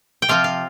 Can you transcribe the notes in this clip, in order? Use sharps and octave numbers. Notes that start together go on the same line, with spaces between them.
G5
C3 F3 C4 F4 F5
F5